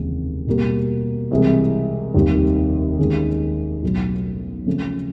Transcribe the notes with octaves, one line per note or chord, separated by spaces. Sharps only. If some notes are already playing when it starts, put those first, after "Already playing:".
Already playing: F1 D#2 C#3 E3 G#3
B2 G3 A#3
C2 C3 E3 G#3
F1 D#2 D#3 G3
D#2 D#3 G#3 C#4
B1 A2 F#3
C#3 F3 A3 C#4